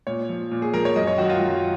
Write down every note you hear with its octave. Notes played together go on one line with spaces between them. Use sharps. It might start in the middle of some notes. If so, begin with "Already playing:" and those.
A#2 C#5
F3
A#2
G#4
F3 A#4
C#5
F#2 D#5
C#5
D#3 F#3 F#4
F4
F#2